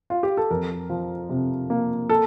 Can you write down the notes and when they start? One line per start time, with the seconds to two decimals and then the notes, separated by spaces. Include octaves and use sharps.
0.10 F4
0.23 G4
0.37 A4
0.51 F2 A#4
0.90 F3
1.29 C3
1.70 A#3
2.10 A4